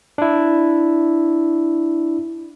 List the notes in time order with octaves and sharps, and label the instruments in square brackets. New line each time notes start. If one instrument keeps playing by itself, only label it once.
[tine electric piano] D4 E4